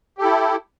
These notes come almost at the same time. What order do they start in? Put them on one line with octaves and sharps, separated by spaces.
G4 A4 E4